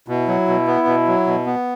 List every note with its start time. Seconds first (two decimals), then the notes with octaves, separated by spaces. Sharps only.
0.08 B2 E4
0.28 F#3
0.48 B2
0.67 B3
0.87 B2
1.07 F#3
1.26 B2
1.46 B3